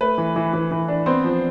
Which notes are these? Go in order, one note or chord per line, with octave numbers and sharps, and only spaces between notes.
A3 B4
E3
E3
E3
E3
D4
B3 C4 C5
F3